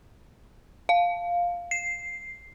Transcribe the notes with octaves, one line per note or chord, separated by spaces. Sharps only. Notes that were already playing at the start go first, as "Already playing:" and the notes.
F5
C7